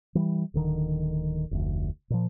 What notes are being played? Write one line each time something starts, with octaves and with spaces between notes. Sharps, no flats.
E3 G3
D1 D3 D#3
F1 D2
A#2 F3